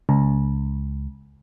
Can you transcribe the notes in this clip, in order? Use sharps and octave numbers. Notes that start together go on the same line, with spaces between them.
C#2